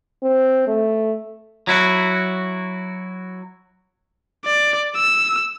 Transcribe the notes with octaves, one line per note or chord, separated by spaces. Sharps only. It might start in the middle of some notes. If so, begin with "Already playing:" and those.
C4
A3
F#3 E4 F#4
D5
E6